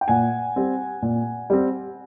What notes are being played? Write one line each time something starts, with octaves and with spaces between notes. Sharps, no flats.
G5
A#2 F#5 G#5
G3 C4
A#2
G3 C4